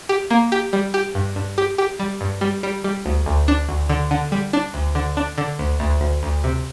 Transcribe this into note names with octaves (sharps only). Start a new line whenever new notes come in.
G4
A#3
G4
G3
G4
G2
G2
G4
G4
G3
G2
G3
G3
G3
D2
D2
D4
D2
D3
D3
G3
D4
D2
D3
D4
D3
D2
D2
D2
D2
C3